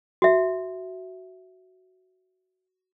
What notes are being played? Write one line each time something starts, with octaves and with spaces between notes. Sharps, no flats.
F#4 E5